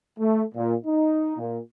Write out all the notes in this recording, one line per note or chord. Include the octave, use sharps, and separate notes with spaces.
A3
A#2
D#4
A#2